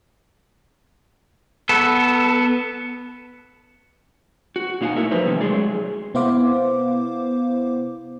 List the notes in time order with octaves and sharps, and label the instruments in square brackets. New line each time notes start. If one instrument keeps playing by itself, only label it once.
[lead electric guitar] B3 A4
[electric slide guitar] F#4
A#2 A#3 D#4 F5 F#5 G#5
A3 E4 A4 A#4 E5
F3 F#3 A#3 D#4 B4 C5
C3 D#3 G3 A3 C#4
F#3 G#3 A3 G#4 D5
[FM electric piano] C3 B3 E4 C5 F5 D6